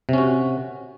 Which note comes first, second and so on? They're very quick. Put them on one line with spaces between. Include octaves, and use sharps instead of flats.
C3 C#4 F#4